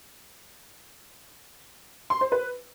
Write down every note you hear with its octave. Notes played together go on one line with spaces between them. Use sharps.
C6
C5
B4